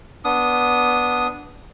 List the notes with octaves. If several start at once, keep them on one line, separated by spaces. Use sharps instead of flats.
B3 D4 D#6